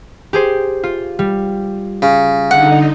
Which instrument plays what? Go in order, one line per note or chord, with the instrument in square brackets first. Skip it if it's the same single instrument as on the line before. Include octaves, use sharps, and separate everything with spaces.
[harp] G4 G#4 C5
F4
G3
[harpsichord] C#3
[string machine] D3 D#4 [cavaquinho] F#5